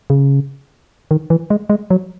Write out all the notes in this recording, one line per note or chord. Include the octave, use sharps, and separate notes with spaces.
C#3
D#3
E3
G#3
G#3
F#3